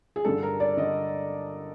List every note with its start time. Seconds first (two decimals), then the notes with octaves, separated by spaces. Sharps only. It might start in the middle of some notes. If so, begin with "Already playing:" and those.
0.16 G#4
0.25 G2 D3 A4
0.43 A#4
0.60 D5
0.77 D3 D#5